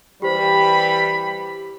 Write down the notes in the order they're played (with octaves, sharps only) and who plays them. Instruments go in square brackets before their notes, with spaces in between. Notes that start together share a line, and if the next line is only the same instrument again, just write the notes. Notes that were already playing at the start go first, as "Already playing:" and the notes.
[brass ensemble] E3 G3 [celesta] G4 C5 [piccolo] B5